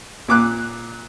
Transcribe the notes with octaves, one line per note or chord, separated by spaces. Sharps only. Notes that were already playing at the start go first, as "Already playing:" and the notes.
A#2 D6 F#6